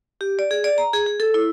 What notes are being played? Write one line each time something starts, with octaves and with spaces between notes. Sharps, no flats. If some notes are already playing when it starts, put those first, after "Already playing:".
G4
D5
G#4
D5
A#5
G#4
G#4
A4
E4